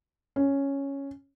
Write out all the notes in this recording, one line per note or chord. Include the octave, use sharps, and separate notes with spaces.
C#4